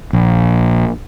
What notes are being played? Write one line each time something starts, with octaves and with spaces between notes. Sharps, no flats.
A#1